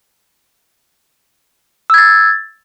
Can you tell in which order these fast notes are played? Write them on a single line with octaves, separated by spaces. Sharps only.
E6 G#6 A6